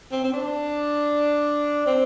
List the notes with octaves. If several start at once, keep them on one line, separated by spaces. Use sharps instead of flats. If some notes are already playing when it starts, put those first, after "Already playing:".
C4
C4
D4
C4